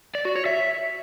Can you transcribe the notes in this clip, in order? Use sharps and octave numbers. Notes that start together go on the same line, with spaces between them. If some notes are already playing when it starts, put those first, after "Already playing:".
D5
F#4
C#5
E5